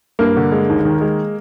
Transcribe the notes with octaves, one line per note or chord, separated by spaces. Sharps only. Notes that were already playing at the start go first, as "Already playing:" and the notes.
G2 A#3
D3
G#3
D#2
D#3
G#3